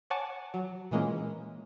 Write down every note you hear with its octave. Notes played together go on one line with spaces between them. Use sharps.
C#5 F#5 G#5 A5 D6
F#3
A#2 E3 G#3 A#3 C#4